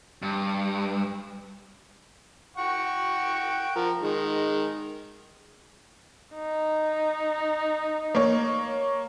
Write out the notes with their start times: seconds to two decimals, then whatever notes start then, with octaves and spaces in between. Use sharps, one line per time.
0.22 G2
2.57 F#5 G5 C#6
3.76 F3 A#4
4.00 D#3 G#3
6.35 D#4
8.15 A#3 C#5